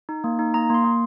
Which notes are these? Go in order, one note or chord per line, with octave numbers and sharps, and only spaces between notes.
D#4
A#3
D#4
A#3 A#5
A#3 C6
A#3